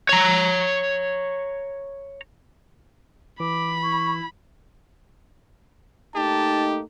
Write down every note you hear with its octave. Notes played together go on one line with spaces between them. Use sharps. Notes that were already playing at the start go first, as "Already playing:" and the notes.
C#5 A#5
E3 B5 D6
E4 C#6
A3 A#3 D#4 G4 A5